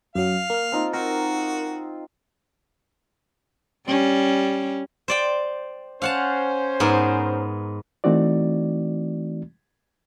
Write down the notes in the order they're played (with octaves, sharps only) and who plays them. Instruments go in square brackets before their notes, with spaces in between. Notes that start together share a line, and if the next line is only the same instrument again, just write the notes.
[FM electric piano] F#2 F#3 [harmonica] F5
[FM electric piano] A#3 F6
[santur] C4 D#4 F4
[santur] C4 [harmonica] F#4 [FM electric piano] A#4
[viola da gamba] G3 C#4
[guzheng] C5 D5 G5
[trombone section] C#4 C5 [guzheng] F5 F#5 A5
[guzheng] G#2 B3 A#4
[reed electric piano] E3 A3 C4 D#4 F#4 D5